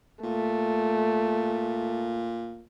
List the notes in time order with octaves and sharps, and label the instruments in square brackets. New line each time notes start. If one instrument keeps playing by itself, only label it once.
[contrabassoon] A#2 [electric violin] A3